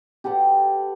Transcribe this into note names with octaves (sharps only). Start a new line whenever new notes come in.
G4 A4 B4 F#5